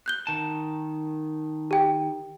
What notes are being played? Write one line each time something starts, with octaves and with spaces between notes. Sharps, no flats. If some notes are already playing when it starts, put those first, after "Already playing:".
F#6 G6 G7
D#3 A5
G4 G5